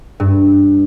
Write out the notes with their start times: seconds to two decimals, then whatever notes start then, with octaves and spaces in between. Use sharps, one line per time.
0.20 G2